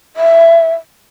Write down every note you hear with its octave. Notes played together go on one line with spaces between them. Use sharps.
E5